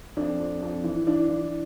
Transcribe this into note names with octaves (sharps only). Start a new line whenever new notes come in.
F2 D4
F2
F2
E3
E3 D4
E3